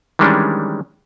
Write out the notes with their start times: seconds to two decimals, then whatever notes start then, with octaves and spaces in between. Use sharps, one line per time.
0.19 D#3 E3 G3 G#3 C#4 D4